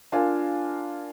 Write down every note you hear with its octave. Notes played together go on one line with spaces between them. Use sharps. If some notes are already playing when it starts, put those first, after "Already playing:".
D4 F4 A#4 F5 G#5